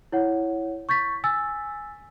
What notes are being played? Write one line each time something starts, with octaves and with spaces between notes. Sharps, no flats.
E4 C#5 F#5
C#6 G6 A6 B6
G#5 E6 A6